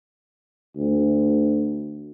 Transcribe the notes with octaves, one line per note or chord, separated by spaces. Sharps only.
D2